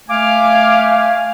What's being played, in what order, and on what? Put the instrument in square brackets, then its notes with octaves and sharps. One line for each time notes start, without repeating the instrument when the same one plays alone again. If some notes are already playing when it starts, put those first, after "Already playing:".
[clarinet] A3 [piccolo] F5 [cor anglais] G#5 [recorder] D6